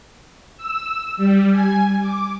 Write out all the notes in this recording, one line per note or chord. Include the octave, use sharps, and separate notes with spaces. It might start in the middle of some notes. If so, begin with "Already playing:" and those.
E6
G3
G#5
D6